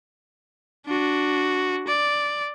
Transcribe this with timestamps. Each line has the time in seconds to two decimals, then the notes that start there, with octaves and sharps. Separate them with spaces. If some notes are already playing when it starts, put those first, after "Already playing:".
0.87 D4 F#4
1.87 D5